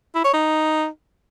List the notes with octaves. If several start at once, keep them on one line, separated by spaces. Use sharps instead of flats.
E4
C#5
D#4